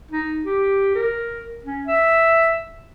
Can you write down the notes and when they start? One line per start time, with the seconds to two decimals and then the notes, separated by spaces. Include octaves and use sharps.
0.11 D#4
0.45 G4
0.95 A#4
1.65 C#4
1.87 E5